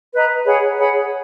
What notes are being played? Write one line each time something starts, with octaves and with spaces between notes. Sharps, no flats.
B4 D#5 A#5
G#4 C#5 F#5 B5
G#4 C#5 F#5 B5